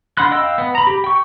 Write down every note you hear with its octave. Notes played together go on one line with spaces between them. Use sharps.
D4 F#5 B5 C6 F#6
D#5 F5 G5 E6 F#6
B3
A#5 B5
G4
G5 C#6